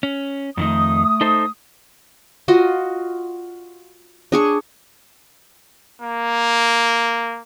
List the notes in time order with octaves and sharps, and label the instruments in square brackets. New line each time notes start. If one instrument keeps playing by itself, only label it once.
[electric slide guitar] C#4
[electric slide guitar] F2 D#3 D#4 [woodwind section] A3 D#6
[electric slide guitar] D#4 A4 C5
[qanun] F4 F#4 D#5
D4 G#4 C#6
[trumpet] A#3